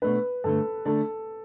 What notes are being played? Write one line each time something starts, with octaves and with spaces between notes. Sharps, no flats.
B2 A3 D4 B4
G2 D3 A3 A4
D3 A3 D4 A4